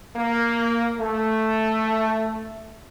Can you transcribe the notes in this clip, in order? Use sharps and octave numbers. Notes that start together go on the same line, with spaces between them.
A#3
A3